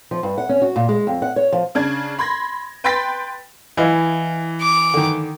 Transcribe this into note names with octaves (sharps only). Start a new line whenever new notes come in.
F3
G2
F#5
C#4
F#4
A#2
G#3
F2
F#5
C#5
F3
C#3 D4 G#6
B5 C6 G#6 A#6
B4 G5 B5 C6 A6 B6
E3 E4 D#5 F5
D6
D3 D#3